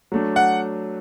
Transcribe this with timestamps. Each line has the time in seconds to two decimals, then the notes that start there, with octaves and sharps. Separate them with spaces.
0.12 F#3 A3 D4
0.36 F#5